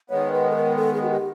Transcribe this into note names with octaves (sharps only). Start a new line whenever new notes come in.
D#3 G#3 B3 C#5
B4
A4
A#4
A4
G#4
F#4
G4